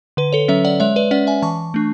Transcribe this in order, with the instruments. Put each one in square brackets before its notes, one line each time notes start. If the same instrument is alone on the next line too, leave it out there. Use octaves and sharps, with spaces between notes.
[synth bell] D3 B4
A4 C#5
F#3 C#4 C#5 E5
D5 F#5
G#3 C#5 E5
B4 D5
C#4 D5 F#5
E5 G#5
E3 A5 C#6
A3 D4